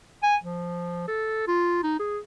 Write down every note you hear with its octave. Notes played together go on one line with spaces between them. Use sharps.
G#5
F3
A4
F4
D#4
G#4